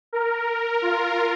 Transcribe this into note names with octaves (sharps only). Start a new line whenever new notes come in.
A#4
F4